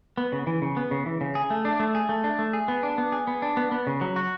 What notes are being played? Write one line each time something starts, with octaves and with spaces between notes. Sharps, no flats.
B3
C#3
E3
C#3
B3
C#3
E3
C#3
G#4
A3
D4
A3
G#4
A3
D4
A3
G#4
B3
D4
B3
G#4
B3
D4
B3
B3
C#3
F#3
F#4